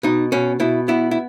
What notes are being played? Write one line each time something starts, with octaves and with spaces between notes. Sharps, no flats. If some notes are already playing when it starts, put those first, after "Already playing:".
B2 D#4
B2 C#4
B2 E4
B3 E4
E4